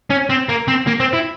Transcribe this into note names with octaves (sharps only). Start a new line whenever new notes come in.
C#4
C4
A#3
C4
A#3
C4
E4